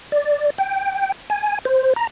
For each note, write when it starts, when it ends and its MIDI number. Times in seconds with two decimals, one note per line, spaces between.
0.12 0.50 74
0.58 1.12 79
1.30 1.59 80
1.65 1.93 72
1.96 2.07 82